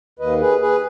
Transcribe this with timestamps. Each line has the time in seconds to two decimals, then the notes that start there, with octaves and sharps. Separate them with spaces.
0.19 D#2 D#3 A#3 B4 D#5
0.40 G#4 B4
0.61 G#4 B4